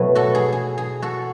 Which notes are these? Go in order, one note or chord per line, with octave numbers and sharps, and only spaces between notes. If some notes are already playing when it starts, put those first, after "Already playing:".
Already playing: B2 F#3 A3 E4 B4
F#4 A4
G#4
G#4
G#4
F#4 A4